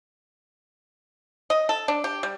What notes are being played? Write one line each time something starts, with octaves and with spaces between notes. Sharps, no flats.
D#5
A4
D4
G4
G3